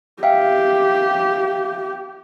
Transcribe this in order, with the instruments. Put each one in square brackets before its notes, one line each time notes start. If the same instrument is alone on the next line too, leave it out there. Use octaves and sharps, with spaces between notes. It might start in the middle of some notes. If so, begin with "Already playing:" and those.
[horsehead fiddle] G4 [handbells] E5 F5 G5